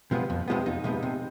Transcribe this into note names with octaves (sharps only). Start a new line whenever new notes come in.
C3 F3 G#3 B3
F2
C3 F3 G#3 B3
F2 D#4
C3 F3 G#3 B3
C3